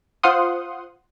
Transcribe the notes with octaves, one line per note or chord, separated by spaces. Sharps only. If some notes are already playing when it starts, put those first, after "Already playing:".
F4 C5 F5 F#5 C6 D#6